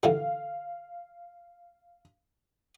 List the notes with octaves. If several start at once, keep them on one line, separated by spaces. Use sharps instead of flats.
D3 E3 G3 F5